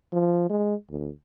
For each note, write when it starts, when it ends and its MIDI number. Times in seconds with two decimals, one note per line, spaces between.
0.13 0.45 53
0.50 0.74 56
0.90 1.10 38